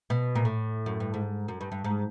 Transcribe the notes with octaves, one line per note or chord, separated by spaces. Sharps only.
B2
A#2
A2
F#2
G2
G#2
F#2
G2
G2
G#2